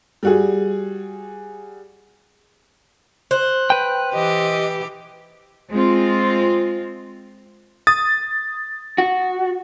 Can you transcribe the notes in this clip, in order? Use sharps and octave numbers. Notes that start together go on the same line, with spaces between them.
G3 F#4 G#4
C5 F#6
B4 G5
E3 G4 D#5
G#3 C4 F4
D#6 A6
F#4